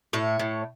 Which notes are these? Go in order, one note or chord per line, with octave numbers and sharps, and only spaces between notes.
A2 C#5
A2